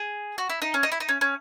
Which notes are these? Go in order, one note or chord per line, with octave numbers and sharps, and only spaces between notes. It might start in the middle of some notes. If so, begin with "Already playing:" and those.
Already playing: G#4
F#4
E4
D#4
C#4
D#4
E4
D#4
C#4
C#4